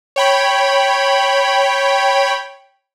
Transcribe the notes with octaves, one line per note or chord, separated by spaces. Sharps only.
C#5 G5 B5